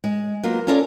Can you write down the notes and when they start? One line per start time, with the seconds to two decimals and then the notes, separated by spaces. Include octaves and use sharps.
0.04 G#3
0.43 F#3 A#3 B3 F4
0.67 C#4 F4 A4 A#4 D5